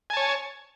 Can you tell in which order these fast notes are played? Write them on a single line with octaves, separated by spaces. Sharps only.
G#5 A5 C#5